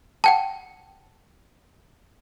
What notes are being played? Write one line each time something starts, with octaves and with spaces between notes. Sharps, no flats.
F#5 G5 A5